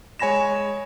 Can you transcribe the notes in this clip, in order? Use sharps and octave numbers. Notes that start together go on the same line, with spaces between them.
G#3 C#5 G#5 B5 A#6 E7